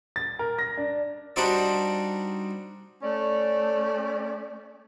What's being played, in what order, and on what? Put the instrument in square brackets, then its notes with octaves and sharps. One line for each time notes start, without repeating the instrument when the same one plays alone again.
[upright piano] A6
A#4
A#6
D4
[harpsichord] G3 D4 D#4 F#4 C5 D5
[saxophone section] A3 C#4 D5